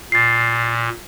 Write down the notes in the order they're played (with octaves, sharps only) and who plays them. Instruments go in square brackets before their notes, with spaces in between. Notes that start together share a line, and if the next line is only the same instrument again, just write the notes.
[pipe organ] A#2 [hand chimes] A6 C7